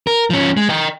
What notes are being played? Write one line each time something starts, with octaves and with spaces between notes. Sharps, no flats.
A#4
F3 C#4
G#3
D#5 G5